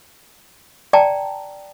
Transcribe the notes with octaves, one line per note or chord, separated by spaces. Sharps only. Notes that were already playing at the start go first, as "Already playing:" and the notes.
D5 G5 A5 A#5